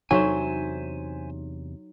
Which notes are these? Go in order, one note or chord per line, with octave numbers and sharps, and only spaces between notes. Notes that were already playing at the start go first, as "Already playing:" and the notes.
E2 C3 F#3 D4 D#4 C5 E5 G#5